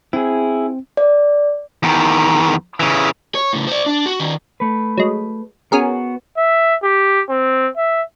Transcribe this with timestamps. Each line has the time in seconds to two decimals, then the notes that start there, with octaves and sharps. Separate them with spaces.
0.13 C4 E4 G#4
0.97 D5
1.83 E2 D#3
2.80 C#3 E3
3.35 C#5
3.53 A2 C#3
3.67 C5 D5
3.86 D4
4.06 F#4
4.20 D#3 C#4
4.60 A3 B4
4.98 F#3 G#3
5.72 B3 C#4 F#4 G#4 A#4
6.37 E5
6.83 G4
7.29 C4
7.77 E5